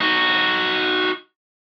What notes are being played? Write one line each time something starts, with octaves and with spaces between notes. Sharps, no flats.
D#4 F#4